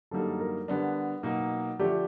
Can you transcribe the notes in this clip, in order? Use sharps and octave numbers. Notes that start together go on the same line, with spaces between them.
F#2 D3 G3 A#3 D#4 A4
A#4
D3 G3 B3 D4
B2 F#3 A#3 D#4
D3 F3 A3 D4 G4